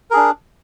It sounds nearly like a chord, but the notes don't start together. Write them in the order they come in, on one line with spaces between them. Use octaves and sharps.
A#4 G#4 D4